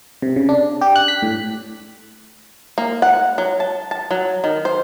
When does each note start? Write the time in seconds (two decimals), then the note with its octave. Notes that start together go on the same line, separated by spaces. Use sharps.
0.22 C3
0.36 C#3
0.49 D4
0.81 G4
0.96 F#6
1.08 B6
1.22 A2
2.78 A#3
3.02 F#5
3.38 F#3
3.60 A5
3.91 A5
4.11 F#3
4.44 D#3
4.65 C5